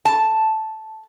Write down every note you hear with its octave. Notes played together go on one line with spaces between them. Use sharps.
A5